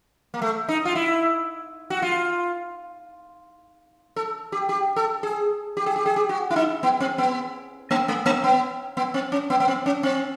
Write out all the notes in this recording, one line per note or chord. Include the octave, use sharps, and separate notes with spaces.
A#3
A3
D#4
F4
E4
F#4
F4
A4
G4
G4
A4
G#4
G4
G#4
G4
G#4
G4
F#4
E4
D#4
B3
C4
B3
A#3
A3
A#3
B3
B3
C4
C#4
B3
B3
C4
C#4
C4